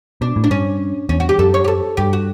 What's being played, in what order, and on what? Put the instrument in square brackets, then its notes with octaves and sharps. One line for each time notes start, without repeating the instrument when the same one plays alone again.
[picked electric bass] B2 [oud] D4
[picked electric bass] A2
[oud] D4
[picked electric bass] G2 [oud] C#4
[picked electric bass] E2 [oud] C#4
[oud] F#4
G4
[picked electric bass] F#2 [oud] A4
[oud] C#5
G4
A4
[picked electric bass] G2 [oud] G4
[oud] F#4